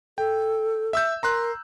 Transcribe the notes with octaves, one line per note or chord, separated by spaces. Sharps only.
A4 G5
E5 E6 G6
A#4 A#5 C6 F#6